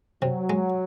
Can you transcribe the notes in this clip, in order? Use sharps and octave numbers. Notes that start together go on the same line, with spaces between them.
C3 F#3
G#3